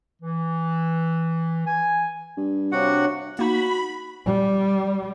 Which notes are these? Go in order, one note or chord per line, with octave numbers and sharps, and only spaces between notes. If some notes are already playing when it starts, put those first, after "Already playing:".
E3
G#5
G2
C3 D4 F#4 C#5 F5 F#5
A#3 D#4 F#4 B5
G3